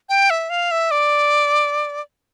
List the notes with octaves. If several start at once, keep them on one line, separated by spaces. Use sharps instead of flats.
G5
E5
F5
E5
D5